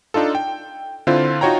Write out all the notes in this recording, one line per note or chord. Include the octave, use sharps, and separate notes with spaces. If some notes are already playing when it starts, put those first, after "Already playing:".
D4 D#4 F4 A4
G5
D3 C4 E4 F4 C5
D#4 F4 F#4 C#5 G5 A#5